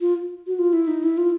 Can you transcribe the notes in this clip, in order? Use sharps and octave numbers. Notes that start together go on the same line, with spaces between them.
F4
F#4
F4
E4
D#4
E4
F4